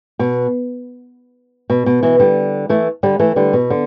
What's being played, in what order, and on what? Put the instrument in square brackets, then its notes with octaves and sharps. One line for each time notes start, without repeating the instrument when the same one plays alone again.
[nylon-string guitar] B2
B2
B2
B2 E3
D3 G3
E3 A3
D3 G3
E3 A3
D3 G3
B2
D3